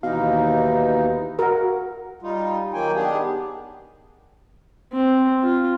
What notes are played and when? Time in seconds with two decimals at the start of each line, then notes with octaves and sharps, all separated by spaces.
0.03 D#2 B2 E3 D#4 F5
1.39 F#4 A#4 F#5
2.22 G3 D#4 F4
2.73 D#3 F#3 A#3 G5 G#5
2.94 D#3 B3 D4 G4 G#4
4.93 C4
5.43 F4